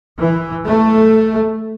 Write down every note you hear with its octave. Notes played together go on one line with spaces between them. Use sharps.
E3
A3